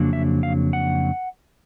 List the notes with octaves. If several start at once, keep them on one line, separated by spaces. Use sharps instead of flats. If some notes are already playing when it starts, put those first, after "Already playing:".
Already playing: F2 C#3 F#3 A#3 D4
E5
F5
F#5